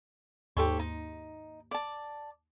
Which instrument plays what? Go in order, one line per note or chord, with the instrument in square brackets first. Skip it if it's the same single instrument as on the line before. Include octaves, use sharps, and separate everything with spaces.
[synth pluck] D#2 G#2 C6 [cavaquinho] G4 A4 C#5
[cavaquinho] D#4
D5 A5